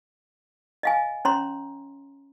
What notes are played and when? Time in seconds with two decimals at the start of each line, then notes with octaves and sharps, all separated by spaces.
0.83 D#5 F5 G#5
1.25 C#4 C#5 A#5 C6